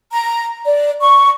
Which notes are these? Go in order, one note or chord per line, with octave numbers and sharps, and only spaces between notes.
A#5
D5
C#6